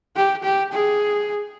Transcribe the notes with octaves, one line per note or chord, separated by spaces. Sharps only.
G4
G4
G#4